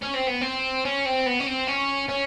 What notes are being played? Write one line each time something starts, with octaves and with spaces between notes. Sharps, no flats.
C#4
C4
B3
C4
C#4
C4
B3
C#4
C4
C#4
C#4